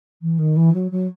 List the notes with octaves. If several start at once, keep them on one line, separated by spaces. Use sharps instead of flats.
E3
D#3
E3
F#3
F#3